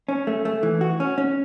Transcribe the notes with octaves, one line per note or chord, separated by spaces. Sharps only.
C#4
A3
A3
E3
F#4
C#4
C#4